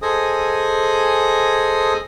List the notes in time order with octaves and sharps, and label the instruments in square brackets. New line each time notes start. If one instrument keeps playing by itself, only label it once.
[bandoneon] G#4 A4 C5 D#5 G#5 D#6